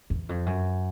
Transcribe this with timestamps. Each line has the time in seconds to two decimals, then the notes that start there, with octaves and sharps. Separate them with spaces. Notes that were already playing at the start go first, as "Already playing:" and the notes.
0.10 E2
0.29 F2
0.46 F#2